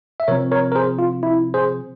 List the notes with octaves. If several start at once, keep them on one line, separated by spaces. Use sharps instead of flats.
E5
C3 F3 C4 A#4 C#5
A#4 C#5
A#4
G#4 C5
F4
E4
G#4 C5